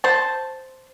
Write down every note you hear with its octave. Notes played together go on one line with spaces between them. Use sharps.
C5 A5